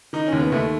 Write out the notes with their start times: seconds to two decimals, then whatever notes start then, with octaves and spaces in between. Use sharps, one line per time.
0.13 D#3 D#4
0.27 C#4
0.32 D#2
0.39 B3
0.52 D#2 A3